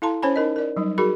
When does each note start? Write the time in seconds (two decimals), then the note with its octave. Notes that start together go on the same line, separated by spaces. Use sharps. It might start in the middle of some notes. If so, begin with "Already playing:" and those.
0.02 E4 A4 F5 A5 A#5 C6
0.23 C#4 C5 C#5 G#5 A5 B5
0.36 D#4 A#4 D#5
0.56 A#4 D5
0.77 F#3 G3 D#4
0.98 F#4 G#4 A#4 B5